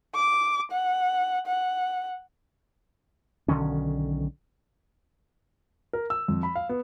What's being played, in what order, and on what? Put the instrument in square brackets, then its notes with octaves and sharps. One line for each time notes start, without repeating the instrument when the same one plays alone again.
[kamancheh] D6
F#5
F#5
[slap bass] B1 D3 D#3 C#4
[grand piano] A#4
E6
F2
B5
F5
B3